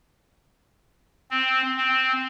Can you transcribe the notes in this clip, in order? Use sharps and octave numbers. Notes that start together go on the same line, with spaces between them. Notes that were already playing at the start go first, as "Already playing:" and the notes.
C4
C4